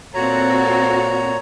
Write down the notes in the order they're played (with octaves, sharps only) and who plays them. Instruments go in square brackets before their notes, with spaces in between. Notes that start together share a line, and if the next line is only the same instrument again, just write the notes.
[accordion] A#2 C#5 A#5 [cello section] C4 F#4 A4